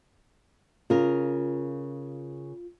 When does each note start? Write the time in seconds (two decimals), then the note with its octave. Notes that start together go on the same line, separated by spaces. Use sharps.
0.90 C#3 F4 A#4